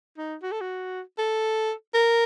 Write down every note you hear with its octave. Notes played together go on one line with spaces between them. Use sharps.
D#4
F#4
A4
F#4
A4
A#4